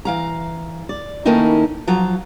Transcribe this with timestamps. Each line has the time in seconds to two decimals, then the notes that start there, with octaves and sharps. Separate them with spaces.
0.05 E3 F5 A#5
0.89 D5
1.25 D#3 A3 A#3 C#4 D#4 E4
1.87 F3 F#3 F4 A#5